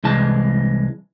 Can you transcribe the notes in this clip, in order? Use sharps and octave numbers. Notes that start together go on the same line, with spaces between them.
C2 E3 G#3 A5